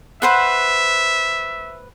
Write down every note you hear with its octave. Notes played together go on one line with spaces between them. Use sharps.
B4 C5 E5 F#5